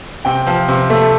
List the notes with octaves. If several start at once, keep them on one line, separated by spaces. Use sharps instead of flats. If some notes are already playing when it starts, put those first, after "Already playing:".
C3 G5
F3
C3
A3